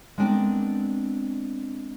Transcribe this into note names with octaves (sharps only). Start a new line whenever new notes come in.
G#3 B3 C4 D4 A#4